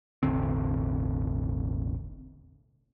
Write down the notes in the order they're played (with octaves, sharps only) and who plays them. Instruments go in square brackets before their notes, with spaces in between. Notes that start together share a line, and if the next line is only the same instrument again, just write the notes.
[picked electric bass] E1 A1 D3 C4